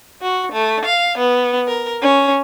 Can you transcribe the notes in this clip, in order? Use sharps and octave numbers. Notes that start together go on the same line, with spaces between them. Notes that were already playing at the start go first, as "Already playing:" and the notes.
F#4
A3
F5
B3
A#4
C#4